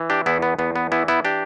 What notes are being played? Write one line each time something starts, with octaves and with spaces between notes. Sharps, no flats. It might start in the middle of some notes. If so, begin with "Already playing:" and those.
Already playing: E3
D4 G4
E2 B3 E4
B3
E2 B3
B3
E3 B3 E4
B3 E4
D4 G4